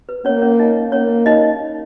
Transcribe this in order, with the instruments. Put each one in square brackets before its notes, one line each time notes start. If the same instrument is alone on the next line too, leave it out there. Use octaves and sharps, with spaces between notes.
[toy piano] B4
[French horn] A#3 [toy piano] C#4 C#5
[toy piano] C#4 C#5
D#4 D#5
[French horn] A#3 [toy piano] C#4 C#5
[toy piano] D#4 D#5